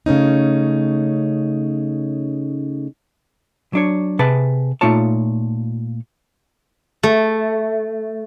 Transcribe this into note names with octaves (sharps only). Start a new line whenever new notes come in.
C#3 A3 C#4 D#4
F#3 D4 C#5
C3 G#4 B4 A5
A#2 A3 D#4 F4 C#5 A5
A3